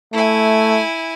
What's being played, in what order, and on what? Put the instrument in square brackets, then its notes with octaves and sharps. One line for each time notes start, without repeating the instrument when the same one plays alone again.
[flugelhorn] A3 [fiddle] E4 G#5